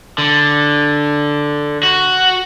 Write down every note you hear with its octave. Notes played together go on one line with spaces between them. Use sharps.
D3
F#4